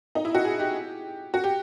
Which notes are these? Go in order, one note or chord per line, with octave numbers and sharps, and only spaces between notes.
D#4
E4
F#4
G#4
G4
F#4
G4